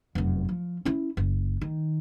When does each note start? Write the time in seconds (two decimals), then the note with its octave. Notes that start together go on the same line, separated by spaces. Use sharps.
0.15 F1 F#2
0.49 F3
0.85 C#4 E4
1.17 F#1
1.61 D#3